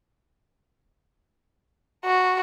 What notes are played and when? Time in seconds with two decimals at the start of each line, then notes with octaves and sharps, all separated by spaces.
2.05 F#4